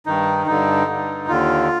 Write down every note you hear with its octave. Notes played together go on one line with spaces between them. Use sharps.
G2 D#3 D#4
G2 D3 D#4
G2 D3
D#2 D3 F4